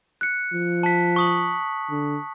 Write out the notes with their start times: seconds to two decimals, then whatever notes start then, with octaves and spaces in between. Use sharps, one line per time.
0.21 F#6 C#7
0.53 F3
0.83 A5 B6
1.16 C#6 D#6 F#7
1.90 D3